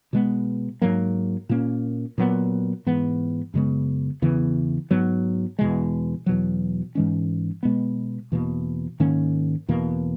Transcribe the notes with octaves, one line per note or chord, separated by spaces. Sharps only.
B2 G#3 B3
G#2 F#3 A#3
A#2 A#3 C#4
A#2 F#3 B3
G#2 E3 B3
F#2 C#3 G#3 B3
E2 C#3 E3 B3
G#2 F#3 B3
E2 B2 G#3
E2 B2 F#3
G#2 E3 G#3 C#4
B2 G#3 B3
E2 B2 A#3
G#2 D#3 A#3 C#4
E2 B2 A#3